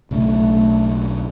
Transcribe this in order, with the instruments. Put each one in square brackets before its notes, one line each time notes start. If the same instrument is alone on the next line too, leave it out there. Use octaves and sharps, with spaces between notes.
[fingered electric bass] B1 C#3 D4 [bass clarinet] A3